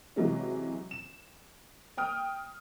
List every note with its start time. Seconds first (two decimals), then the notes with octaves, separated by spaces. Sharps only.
0.16 C3 E3 F#3 G#3 C#4
0.91 E7
1.97 G5 D#6 F6